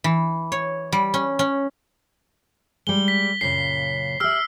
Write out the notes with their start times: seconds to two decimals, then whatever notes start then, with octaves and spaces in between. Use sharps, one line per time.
0.04 E3
0.52 C#5
0.92 G3
1.14 C#4
1.39 C#4
2.87 G3 G#3 G7
3.08 B6
3.41 F#2 A#2 C#3 C7
4.20 G4 E5 E6 F6